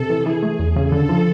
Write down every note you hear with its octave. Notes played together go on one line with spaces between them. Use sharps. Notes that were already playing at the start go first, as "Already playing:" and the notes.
Already playing: C3 A4
E3
E3 G#4
A3
E2
C#3
D3 A4
F3